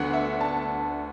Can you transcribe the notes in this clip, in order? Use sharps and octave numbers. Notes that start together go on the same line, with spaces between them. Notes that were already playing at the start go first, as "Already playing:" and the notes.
Already playing: D2 D3 B3 D4 F#5
E5
A5